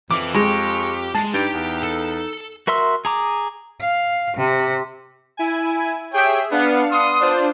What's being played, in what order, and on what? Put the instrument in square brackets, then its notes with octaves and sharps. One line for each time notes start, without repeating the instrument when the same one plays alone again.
[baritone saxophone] F2 [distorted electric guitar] E3 [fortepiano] D6
[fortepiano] G#3 [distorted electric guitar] G4 [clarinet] C#6
[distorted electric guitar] G#3 [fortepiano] A5
[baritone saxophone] G2 [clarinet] D#4 [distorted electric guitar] G4 G5
[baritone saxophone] E2
[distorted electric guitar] A4
[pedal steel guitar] F#4 A#4 E5 C6 E6
G#4 A#5 D6
[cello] F5
C3
[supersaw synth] E4 G#5
[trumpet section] G4 C#5 G5 [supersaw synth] G#4 E5
[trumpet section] B3 [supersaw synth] D4 F5 C#7
[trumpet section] B3 C6 D#6
[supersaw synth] D4 F4 C5